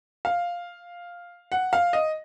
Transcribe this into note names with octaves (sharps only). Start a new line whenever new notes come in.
F5
F#5
F5
D#5